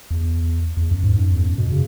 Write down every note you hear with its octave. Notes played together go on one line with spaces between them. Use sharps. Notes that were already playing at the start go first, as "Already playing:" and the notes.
E2
E2
F#2
G#2
F#2
E2
F#2
B2
C#3